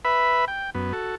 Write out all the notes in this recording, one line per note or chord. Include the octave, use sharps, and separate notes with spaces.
B4 E5 B5
G5
F#2 B3
F#4 A4